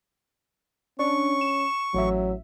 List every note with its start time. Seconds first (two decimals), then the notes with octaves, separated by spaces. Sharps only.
0.99 C#4 D4 C#6
1.41 E7
1.94 A1 F#3 E5